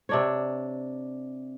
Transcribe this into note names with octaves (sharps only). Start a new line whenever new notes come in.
C3 D4 C#5